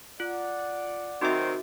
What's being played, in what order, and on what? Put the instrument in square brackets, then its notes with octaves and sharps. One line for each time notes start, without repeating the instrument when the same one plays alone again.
[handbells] F4 [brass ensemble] D5 F#5
[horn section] D#3 F#3 C4 [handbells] D#4 E5 [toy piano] F#4 A4 D6